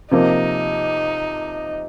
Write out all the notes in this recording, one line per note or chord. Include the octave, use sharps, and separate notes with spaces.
C3 F3 A#3 D#4